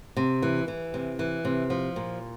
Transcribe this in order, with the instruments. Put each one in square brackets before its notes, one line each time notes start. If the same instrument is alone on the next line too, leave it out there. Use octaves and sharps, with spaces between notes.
[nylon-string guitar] C3
E3
E3
C3
E3
C3
F3
A#2